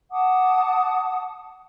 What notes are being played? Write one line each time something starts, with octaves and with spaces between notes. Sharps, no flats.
F#5 A5 D6 D#6